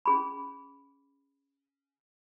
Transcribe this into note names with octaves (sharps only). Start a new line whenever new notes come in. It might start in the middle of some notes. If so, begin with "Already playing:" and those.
C#4 G#4 B5